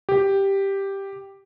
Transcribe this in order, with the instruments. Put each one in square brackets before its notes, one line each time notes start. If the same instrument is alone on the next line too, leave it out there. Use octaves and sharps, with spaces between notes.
[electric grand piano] G4